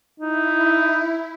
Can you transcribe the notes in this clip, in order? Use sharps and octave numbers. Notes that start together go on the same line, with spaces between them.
D#4 E4